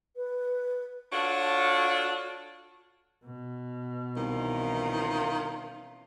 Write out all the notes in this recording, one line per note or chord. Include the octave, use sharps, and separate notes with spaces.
B4
D4 F4 F#4 A4 C#5
B2
C2 D#3 E3 C#4 F4